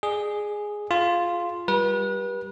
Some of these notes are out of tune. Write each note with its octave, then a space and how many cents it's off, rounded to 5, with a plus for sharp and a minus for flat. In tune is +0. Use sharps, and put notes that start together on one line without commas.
G#4 +0 D5 +40
F4 +0 G#4 +25
G3 +0 G4 +0 B4 -35